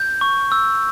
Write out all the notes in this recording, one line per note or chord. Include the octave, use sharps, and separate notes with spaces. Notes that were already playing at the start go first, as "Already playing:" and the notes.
Already playing: G6
C#6
E6